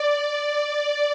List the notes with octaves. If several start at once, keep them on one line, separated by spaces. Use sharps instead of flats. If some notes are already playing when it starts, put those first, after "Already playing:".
Already playing: D5